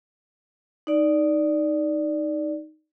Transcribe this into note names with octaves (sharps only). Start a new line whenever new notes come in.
D#4 D5